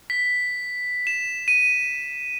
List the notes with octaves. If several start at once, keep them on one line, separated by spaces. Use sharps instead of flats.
B6
E7
D#7